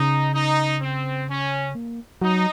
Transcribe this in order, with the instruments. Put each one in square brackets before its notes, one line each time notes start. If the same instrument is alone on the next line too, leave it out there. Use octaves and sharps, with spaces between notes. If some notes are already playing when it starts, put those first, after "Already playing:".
Already playing: [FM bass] C#3 [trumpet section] D#4
[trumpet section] D#4
C4
C#4
[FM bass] A#3
[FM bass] F#3 [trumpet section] D#4